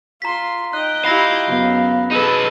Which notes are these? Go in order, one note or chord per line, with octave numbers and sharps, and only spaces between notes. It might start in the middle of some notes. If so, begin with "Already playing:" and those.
F4 A#5 C6 B6
D#4 D#5 G5 F#6
E4 F4 G4 F5 B5 A#6
F#2 C#3 B3
D#4 G#4 A4 B4 A5